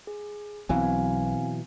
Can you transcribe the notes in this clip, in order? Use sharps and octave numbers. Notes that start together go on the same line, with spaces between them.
G#4
B1 B2 E3 F#3 C4 F5 G#5